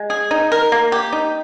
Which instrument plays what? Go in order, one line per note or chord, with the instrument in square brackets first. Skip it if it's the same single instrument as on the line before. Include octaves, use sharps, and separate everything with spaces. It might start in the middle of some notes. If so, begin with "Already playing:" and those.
Already playing: [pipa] G#3
G#4
D#4
A#4
A#3
G4
D#4